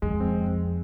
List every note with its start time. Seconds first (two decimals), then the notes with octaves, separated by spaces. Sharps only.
0.02 F2 G#3
0.20 C4